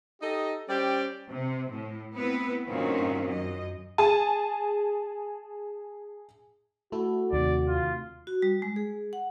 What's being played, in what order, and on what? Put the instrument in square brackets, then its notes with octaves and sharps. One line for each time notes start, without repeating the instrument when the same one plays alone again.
[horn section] D#4 G4 A4 D#5
G3 C#4 G4 C5 D5 G5
[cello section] C3
A2
B3 C4 E4 B4
G2 A#2 D#3 C4 C#4 F#4
F#2 D#5
[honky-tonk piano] G#4 G#5 A5
[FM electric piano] A3 E4 A4 [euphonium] F#4
[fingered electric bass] D#2 [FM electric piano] C3 D#3 A3 [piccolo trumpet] D5
[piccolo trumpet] F4
[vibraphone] F#4
G3
G#3
G#4
F#5